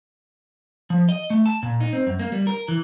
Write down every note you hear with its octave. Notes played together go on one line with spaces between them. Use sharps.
F3
D#5
A3
A5
A#2
D#4
C4
F#2
A#3
G3
A#4
E3